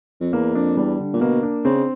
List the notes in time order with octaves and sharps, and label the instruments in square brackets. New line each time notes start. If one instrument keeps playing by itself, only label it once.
[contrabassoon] F2
[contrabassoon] E2 [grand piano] A#3
[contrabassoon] F2 [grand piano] D4
[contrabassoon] E2 [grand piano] G3
[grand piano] D3
[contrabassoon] A#2
[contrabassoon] B2 [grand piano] A#3
[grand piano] D4
[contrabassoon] C#3 [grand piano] C4